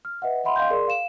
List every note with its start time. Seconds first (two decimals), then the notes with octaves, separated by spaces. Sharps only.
0.05 F6
0.22 B4 D#5 E5 F#5
0.44 D#5 E5 F#5 B5 C6
0.56 D#5 F5 G5 C6 G6
0.70 G#4 A#4 D5 C6
0.88 F5 E7